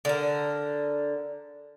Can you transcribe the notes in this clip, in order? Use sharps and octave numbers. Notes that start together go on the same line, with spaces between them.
D3 A#4